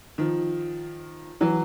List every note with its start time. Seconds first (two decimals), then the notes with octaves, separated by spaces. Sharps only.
0.18 D#3 F3
1.41 E3 F#3